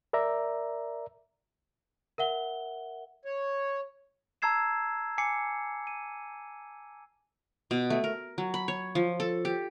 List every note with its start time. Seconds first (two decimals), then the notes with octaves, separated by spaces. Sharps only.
0.13 A#4 D5 E5 A#5
2.18 A#4 E5 F#5 G7
3.25 C#5
4.42 A5 A#5 E6 G#6 C7 E7
5.18 G#5 D6 C7 C#7
5.87 D#7
7.71 B2
7.90 A3
8.04 A#4
8.38 F#3
8.54 B5
8.68 C#5
8.95 F3
9.20 A4
9.45 G4